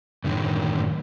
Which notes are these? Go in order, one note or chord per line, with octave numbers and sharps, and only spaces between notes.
F#2 A2 D3 D#3